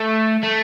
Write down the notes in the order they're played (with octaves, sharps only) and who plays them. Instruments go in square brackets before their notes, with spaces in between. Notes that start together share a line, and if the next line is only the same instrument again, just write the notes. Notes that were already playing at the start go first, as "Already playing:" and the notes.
Already playing: [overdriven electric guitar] A3
A3